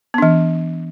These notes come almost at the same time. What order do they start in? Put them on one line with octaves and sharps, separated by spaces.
B3 D4 E3